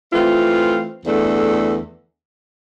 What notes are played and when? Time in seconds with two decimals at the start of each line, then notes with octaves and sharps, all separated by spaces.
0.12 E3 A3 C4 F4
1.05 E2 D3 A3